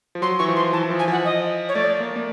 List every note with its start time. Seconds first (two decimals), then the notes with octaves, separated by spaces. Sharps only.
0.15 F3
0.22 F#3 C6
0.39 E3 C#6
0.48 F3
0.56 C6
0.73 E3 A5
0.85 E3
0.90 F3
0.99 G#5
1.08 F3 F#5
1.25 D#5
1.69 C#5
1.75 A3 D5
2.00 A#3
2.16 A#3